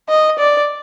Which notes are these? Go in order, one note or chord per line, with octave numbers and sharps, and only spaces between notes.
D#5
D5